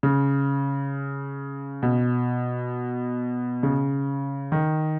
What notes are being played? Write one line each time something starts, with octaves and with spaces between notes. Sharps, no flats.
C#3
B2
C#3
D#3